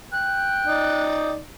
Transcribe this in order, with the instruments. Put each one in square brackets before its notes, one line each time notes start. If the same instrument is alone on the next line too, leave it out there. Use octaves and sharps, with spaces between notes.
[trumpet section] G5 [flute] F#6
[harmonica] D#4 D5